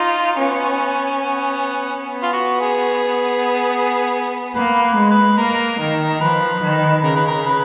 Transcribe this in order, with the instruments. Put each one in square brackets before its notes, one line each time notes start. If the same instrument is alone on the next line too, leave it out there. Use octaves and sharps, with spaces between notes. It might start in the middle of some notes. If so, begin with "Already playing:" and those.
Already playing: [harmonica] D#4 [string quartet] F4
[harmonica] B3 [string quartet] C#4
[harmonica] B3
[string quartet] B3
[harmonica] F4
F#4
G#4
[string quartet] A#3 [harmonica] B4
[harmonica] B4
[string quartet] G#3
[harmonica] B4
[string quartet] A#3 [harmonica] A#4
[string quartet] D#3 [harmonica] A#4
[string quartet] F3 [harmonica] B4
[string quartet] D#3
[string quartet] C#3 [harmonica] A#4
[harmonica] B4
A#4
B4